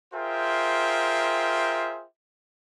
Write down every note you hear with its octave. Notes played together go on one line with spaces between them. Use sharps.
F4 G#4 A#4 C5 E5 G5